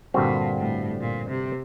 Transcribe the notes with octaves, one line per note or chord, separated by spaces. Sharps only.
G2 A#2 D3 G3 C4 F#4
A2
A#2
C3